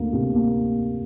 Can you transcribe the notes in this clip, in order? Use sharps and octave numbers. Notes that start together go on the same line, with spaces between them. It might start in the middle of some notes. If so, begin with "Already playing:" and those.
Already playing: D2 A#3
C3
A#3